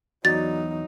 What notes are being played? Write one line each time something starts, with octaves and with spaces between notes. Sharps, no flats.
E2 F#3 D#4 F#4 D5 A6